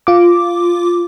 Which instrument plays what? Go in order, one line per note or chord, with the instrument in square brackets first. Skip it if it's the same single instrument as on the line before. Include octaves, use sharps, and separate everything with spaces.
[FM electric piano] F4 D6